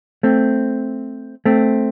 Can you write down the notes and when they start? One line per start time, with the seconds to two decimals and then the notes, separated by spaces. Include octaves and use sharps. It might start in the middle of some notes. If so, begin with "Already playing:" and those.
0.23 A3 C4
1.45 A3 C4